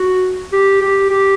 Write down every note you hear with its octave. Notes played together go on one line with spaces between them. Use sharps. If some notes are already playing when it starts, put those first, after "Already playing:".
Already playing: F#4
G4
G4
G4